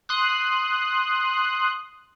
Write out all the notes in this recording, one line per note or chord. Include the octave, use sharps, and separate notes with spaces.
C6 D#6 F#6